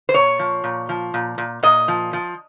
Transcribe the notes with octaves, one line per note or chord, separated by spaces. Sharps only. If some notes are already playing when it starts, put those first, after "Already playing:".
C5
A#2 C#5
F3
A#2
F3
A#2
A#2
A#2 D#5
F3
F3